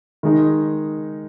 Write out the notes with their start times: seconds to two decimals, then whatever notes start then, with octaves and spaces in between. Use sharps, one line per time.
0.23 D#3 G#3 D#4